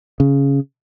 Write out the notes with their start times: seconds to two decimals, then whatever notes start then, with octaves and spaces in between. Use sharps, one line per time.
0.20 C#3